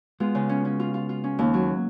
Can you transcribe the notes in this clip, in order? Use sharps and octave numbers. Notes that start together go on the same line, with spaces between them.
G#3 B3 F4
C#3
C#4
C#4
F4
F4
F4
C#4
D#2
F#3